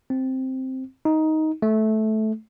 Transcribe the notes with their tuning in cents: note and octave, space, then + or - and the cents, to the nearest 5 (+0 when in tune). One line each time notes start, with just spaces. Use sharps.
C4 +0
D#4 +10
A3 -15